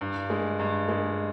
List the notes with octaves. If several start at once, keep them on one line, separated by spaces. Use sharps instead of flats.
G2
G#3
G2
G#3